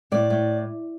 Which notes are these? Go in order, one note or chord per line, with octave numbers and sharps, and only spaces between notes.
A2 D5
A2